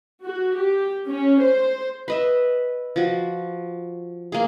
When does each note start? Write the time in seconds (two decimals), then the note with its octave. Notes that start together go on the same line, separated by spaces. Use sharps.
0.25 F#4
0.59 G4
1.08 C#4
1.41 C5
2.08 B4 D#5 E5
2.96 F3 F#4
4.32 A#3 G#4